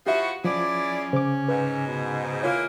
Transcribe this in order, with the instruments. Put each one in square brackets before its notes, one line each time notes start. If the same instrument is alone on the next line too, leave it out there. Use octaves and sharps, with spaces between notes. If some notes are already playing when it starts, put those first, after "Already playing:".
[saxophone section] F3 F#4 [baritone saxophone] E4 [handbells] G4 E5
[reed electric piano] F3 [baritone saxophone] C#4 [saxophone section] E4 G#4 D5
[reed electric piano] C#3 D6 [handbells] C5
[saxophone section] G#2 [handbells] B4
[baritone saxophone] B2
[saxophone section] E3 G#3 A#3 [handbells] F4 C#5